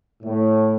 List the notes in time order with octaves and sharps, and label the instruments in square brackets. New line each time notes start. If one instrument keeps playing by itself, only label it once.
[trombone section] A2